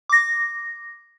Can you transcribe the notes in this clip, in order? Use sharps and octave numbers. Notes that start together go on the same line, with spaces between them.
D6 A#6